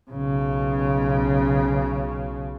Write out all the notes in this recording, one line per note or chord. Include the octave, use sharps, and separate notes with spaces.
B1 C#3